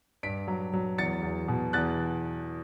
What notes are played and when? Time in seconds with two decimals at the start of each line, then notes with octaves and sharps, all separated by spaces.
0.23 G2 B6 D7
0.48 F#3
0.74 F#3
0.98 E2 A6 C#7
1.23 E2
1.48 B2
1.73 E2 F#6 A6